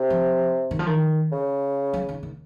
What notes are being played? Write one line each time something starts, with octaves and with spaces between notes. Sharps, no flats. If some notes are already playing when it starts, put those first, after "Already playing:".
Already playing: C3
F3
D#3
F3
D#3
C#3
F#3
D#3
D#3